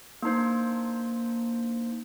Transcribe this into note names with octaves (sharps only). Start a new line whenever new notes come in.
A#3 D4 D#4 C5